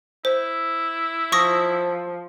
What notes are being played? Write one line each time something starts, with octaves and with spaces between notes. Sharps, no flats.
E4 C5
F3 C#6 D#6 A#6